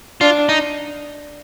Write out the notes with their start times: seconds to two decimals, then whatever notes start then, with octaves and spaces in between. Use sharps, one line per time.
0.21 D4 F4
0.49 D#4